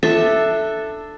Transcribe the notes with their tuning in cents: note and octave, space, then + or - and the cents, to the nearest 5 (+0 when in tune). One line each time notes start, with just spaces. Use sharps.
D4 +15 A4 +0 E5 +0